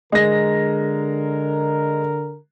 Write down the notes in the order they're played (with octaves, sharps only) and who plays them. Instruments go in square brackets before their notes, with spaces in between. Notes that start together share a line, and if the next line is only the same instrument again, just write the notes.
[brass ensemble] D3 A#4 [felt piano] G#3 A#6